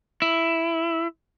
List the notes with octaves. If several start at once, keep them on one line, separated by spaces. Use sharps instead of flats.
E4